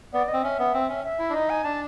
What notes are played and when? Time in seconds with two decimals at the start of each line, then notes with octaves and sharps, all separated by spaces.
0.13 B3 D5
0.28 C4 D#5
0.43 C#4 E5
0.59 B3
0.74 C4
0.89 C#4
1.04 E5
1.19 E4
1.30 D4
1.34 D#4 D#5
1.50 G#5
1.64 D4 A5